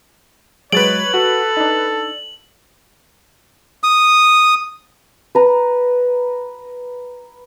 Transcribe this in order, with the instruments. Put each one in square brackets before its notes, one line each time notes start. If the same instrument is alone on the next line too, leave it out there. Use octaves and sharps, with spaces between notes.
[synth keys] F#3 G#3 [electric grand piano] B4 A6 D7 [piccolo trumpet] C#5 [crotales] F#7
[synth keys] F#4 [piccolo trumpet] A4
[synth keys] D4 D#4
[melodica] D#6
[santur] B4 A#5